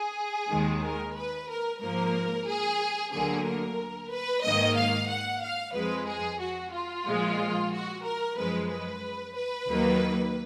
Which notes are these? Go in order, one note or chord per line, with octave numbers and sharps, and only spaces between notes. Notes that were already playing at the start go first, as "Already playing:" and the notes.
Already playing: G#4
D#2 D#3 G#3
A#4
B4
A#4
G#2 F3 A#3 A#4
G#4
D2 D3 F#3 A#3 G#4
A#4
B4
G#2 D#3 A#3 D#5
F5
F#5
F5
F2 F3 G#3 B4
G#4
F#4
F4
A#2 F3 G#3
F#4
A#4
F#2 F3 G#3 B4
B4
B4
D#2 D#3 F#3 A#3